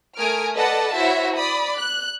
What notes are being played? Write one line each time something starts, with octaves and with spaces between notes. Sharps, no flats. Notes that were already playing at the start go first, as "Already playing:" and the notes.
A3 A#4 G#5 D#6 F6 D7
A4 B4 D5 D#5 F#5 A5
E4 F#4 C5 C#5 E5
D5 B5 D#6
F#6